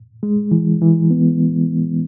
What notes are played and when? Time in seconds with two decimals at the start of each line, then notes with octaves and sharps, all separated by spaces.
0.23 G#3
0.51 E3
0.82 E3
1.10 B3